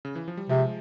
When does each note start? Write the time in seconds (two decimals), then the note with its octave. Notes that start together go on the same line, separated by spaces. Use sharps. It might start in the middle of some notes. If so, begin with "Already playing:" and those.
0.05 C#3
0.15 E3
0.28 F3
0.37 G3
0.49 C3 F3 G#3